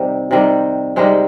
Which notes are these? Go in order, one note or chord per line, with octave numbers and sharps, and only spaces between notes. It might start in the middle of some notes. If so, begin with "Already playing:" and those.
Already playing: C3 D#3 G3
C3 D#3 G3
C3 D#3 G3 G#3